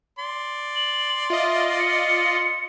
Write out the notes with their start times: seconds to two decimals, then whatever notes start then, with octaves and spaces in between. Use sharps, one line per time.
0.19 D5 C6
0.75 F#7
1.30 F4 D#5 E5
1.79 C#7